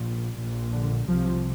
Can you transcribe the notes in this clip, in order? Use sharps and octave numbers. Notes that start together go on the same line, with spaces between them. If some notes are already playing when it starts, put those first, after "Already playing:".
Already playing: A#1 A#2
A#1 A#2
D3
C2 C3 F3